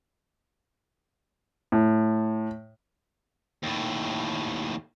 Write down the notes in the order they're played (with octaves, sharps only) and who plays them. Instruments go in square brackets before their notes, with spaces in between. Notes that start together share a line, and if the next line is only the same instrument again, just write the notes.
[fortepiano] A2
[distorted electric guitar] D#2 A2